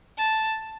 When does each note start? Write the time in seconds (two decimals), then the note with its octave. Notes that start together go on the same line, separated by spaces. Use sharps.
0.18 A5